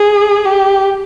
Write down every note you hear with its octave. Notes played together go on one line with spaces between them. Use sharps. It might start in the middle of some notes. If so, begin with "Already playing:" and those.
Already playing: G#4
G4